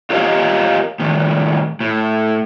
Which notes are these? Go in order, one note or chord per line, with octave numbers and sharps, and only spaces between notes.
F4 G4 A#4 C#5 D#5 F5
A2 D#3
A2